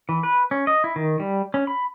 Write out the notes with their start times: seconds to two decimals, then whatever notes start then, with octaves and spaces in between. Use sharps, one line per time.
0.09 E3
0.23 B4
0.51 C#4
0.67 D#5
0.84 E4
0.96 D#3
1.20 G3
1.54 C#4
1.67 B5